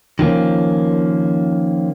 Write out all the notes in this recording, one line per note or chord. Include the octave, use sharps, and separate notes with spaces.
D#3 F3 A#3 C#4